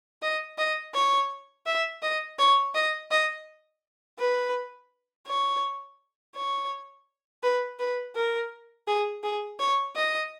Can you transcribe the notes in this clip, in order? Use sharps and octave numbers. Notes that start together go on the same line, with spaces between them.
D#5
D#5
C#5
E5
D#5
C#5
D#5
D#5
B4
C#5
C#5
B4
B4
A#4
G#4
G#4
C#5
D#5